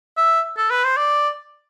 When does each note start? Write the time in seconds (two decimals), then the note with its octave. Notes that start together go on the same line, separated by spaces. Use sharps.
0.17 E5
0.57 A4
0.70 B4
0.84 C5
0.97 D5